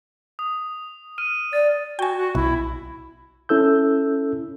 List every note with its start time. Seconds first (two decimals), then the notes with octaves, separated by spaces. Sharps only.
0.39 D#6
1.18 F6 D#7
1.53 D5 A6
1.99 F#4 G5 G#5
2.17 F#4
2.35 B1 E4
3.49 C#4 E4 A4 E6 G6